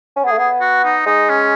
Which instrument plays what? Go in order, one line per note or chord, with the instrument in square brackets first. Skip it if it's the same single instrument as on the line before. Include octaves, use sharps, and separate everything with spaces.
[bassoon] C#4
B3
[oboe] G#4
[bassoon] A3
[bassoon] B3 [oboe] G#4
[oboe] F#4
D#4
[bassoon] G#3 [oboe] D#4
[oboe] C#4